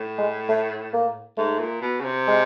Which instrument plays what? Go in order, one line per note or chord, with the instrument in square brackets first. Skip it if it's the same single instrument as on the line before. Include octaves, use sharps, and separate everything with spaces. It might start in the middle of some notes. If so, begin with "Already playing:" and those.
Already playing: [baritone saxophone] A2
[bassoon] G#3
A3
A#3
[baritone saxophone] G#2 [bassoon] A3
[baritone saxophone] A#2
B2
C#3
C3
[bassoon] G#3